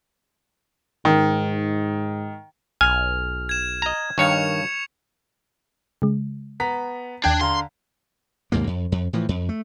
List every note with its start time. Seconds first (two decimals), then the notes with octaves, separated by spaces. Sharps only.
1.05 G#2 D#3
2.81 B1 G#5 F6
3.49 G#6 E7
3.82 D#5 A#5
4.18 G2 D#3 C#5 F5 C#6 C#7 F7
6.02 C#3 G#3
6.60 B3 A#5 B6
7.24 D#2 D4 G5 G#6
7.41 D3 F5 A#5 C6
8.52 D#2 G#2 C3 A#3
8.67 F2
8.92 F2
9.13 A2 E3 F3
9.29 F2
9.49 A3